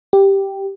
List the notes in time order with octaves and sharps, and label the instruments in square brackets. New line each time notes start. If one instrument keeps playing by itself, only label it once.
[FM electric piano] G4